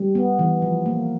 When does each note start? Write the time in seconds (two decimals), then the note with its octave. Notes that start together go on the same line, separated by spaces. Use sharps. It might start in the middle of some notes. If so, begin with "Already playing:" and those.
Already playing: G3
0.15 B3
0.39 E3
0.62 F3
0.86 A#3